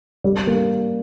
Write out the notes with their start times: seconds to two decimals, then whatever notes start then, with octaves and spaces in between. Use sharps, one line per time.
0.24 G3
0.47 A#3